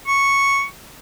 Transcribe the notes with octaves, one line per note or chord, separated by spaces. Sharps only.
C#6